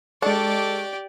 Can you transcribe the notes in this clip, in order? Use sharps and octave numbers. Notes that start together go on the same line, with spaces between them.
G#3 D4 G4 A4 D5 D#5 C#6